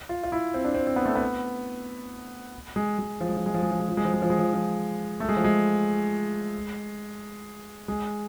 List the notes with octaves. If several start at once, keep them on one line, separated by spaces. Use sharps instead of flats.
F4
F4
E4
C4
D4
C4
C4
B3
A3
B3
G#3
G#3
F3
G#3
F3
G#3
F3
G#3
F3
G#3
F3
G#3
F3
G#3
F3
G#3
F3
F3
A3
G#3
F3
G#3
G#3